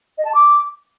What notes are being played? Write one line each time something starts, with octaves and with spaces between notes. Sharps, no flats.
D#5
A5
D6